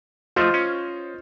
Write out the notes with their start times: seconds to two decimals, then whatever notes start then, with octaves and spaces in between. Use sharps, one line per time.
0.36 F3 A3 F4 C5 D#5
0.54 C#4